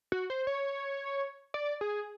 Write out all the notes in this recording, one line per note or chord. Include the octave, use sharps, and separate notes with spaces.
F#4
C5
C#5
D5
G#4